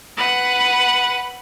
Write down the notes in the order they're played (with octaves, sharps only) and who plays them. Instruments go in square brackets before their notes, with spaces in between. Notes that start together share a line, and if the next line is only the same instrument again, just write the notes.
[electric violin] B4 F#5